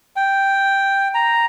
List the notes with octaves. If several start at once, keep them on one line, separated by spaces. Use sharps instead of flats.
G5
A#5